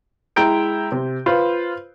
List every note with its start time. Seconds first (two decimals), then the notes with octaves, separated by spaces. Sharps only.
0.36 G#3 E4 G5 A#5 G6 D7
0.92 C3
1.26 F4 B4 C5